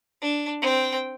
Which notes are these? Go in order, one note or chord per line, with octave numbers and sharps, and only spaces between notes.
D4
C4 G5